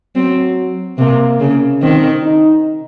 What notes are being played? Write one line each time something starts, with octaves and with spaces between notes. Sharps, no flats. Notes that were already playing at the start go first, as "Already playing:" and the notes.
F#3 C4
C3 A#3
C#3
D#3 C4
D#4